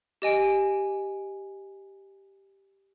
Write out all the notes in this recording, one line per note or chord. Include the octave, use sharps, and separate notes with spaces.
G4 D#5 G#5 D7